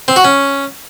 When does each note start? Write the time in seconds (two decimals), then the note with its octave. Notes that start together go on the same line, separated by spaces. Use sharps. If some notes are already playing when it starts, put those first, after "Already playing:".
0.08 C4
0.16 F#4
0.24 C#4